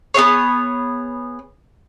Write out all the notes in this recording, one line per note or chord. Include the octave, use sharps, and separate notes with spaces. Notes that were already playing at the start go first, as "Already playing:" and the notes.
B3 C4 G#4 C#5